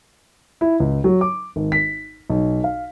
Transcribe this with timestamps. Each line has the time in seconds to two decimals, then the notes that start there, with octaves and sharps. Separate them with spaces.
0.61 E4
0.80 C#2
1.04 F#3
1.21 D6
1.56 G#1
1.72 B6
2.30 B1
2.64 F5